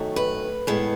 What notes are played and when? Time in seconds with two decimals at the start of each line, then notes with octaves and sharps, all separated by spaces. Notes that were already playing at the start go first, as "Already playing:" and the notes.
Already playing: F#2 D#3 F#3 A3
0.16 B4
0.67 A2 G#3 B3